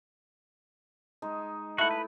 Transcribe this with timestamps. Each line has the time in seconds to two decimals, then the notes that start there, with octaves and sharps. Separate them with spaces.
1.22 G#3 D#4
1.78 A3 E4 F#4 F#5
1.91 B4